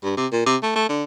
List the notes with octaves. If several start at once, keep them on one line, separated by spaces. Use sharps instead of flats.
G2
C3
A#2
C3
A3
A3
D3